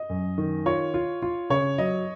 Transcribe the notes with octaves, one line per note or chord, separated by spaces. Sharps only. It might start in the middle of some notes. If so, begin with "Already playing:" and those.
Already playing: D#5
F#2
D#3
F4 C#5
F4
F4
C#3 C#5
F#3 D#5